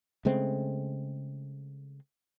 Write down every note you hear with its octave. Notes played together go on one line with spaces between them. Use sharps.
C#3 G#3 A3 C4